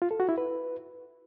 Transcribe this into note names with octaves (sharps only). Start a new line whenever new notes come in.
F4
A4
F#4
E4
B4